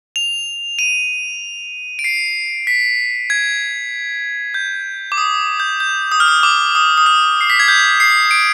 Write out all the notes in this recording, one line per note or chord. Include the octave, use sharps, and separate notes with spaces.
F7
D#7
D7
C7
B6
G#6
G6
D6
D#6
G6
G6
D#6
F6
D#6
D6
D#6
D#6
F6
C7
B6
G#6
G6
C7
D7